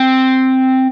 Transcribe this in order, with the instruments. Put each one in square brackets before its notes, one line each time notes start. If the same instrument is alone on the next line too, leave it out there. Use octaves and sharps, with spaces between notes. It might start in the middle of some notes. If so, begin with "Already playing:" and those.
Already playing: [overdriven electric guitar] C4